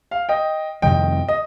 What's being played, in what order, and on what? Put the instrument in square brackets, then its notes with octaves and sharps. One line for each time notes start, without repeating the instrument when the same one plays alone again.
[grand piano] F5
D#5 G5
[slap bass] F2 C3 D#3 G3 [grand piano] D#5 G5
[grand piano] D#5